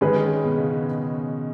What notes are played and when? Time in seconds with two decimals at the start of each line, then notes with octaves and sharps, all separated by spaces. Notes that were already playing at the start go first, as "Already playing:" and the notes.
0.01 D#3 G#3 C#4 G#4 B4
0.44 B2
0.57 C#3